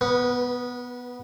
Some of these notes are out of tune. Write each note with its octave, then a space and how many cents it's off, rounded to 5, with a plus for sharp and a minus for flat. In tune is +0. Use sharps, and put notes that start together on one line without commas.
B3 +0 B4 -30